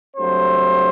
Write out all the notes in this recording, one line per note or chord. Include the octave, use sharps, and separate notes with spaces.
G2 F#3 A3 C4 C5